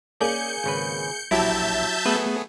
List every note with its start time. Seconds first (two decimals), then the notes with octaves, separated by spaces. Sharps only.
0.21 A#3 C#4 G#4 D5 G#5 G6 C#7
0.64 G#1 C#3 B4
1.31 A#1 F#3 E4 G4 E5 A5 G6
2.06 A3 B3 G#4 B4